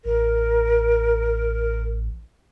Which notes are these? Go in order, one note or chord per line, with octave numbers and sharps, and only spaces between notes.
A1 A#4